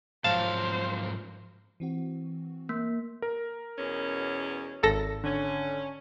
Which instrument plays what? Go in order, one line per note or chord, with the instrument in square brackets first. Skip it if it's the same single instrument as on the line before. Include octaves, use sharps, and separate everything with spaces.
[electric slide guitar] G#2 F3 F#3 [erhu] C5 [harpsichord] F5 [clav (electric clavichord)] A5
[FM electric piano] E3 C4 F#4
[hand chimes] A#3
[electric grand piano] A#4
[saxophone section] E2 B2 C#4
[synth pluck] G#1 A4 A#6
[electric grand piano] D3 [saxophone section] C#4